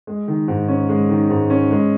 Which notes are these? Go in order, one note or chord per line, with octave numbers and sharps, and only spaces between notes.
G#3
D#3
G#2
C#4
G#3
D#3
G#2
C#4
G#3